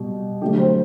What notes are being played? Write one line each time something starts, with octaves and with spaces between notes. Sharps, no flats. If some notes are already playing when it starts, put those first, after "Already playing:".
Already playing: B2 G3 G4
D3 F#3 A3 G4
C5